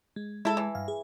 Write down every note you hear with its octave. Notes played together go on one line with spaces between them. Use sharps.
G#3
G#3 E4 A4
E3
G2 F5
G#4